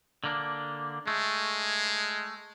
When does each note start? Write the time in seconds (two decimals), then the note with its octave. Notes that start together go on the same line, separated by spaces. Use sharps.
0.24 D3 A#3 D4
1.07 G#3 A3